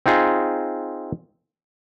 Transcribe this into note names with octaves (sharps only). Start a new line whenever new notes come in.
C4 D#4 F4 G#4